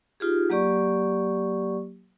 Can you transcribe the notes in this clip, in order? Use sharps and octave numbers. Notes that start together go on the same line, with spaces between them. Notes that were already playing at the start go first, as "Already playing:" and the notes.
D#4 F4 G4 G#4
F#3 A#3 G4 D5 C#6